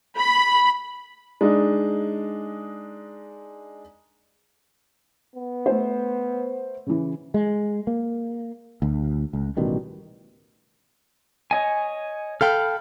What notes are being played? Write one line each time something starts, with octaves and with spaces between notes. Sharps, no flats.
B5
G#3 D4 D#4
B3
A3 C5
C#3 E3
G#3
A#3
D2
C#2
A1 B2 D#3 G3
C#5 D#5 G#5
A4 F5 G5 B5 F6